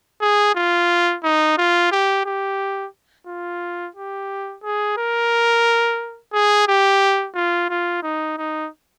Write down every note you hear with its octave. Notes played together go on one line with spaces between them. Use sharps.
G#4
F4
D#4
F4
G4
G4
F4
G4
G#4
A#4
G#4
G4
F4
F4
D#4
D#4